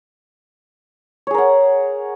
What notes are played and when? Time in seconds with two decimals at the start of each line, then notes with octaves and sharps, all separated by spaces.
1.27 C#5
1.31 G#4
1.34 A#4
1.38 F#5